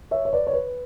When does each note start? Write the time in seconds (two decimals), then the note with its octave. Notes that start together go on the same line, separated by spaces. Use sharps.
0.11 C#5 E5
0.25 C#5
0.33 B4 D5
0.47 C#5
0.53 B4